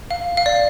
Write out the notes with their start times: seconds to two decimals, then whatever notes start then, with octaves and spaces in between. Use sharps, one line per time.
0.11 F5
0.37 F5
0.46 D5